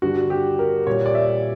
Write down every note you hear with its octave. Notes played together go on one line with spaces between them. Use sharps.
G2 D3 G3 F#4
G4
A#4
A#2 G3 C#5
D5
E5